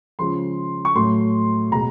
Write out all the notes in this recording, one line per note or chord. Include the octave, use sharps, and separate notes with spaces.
C#3 F3 G#3 C6
C#6
A2 F#3 A3 C6
B2 G#3 A#5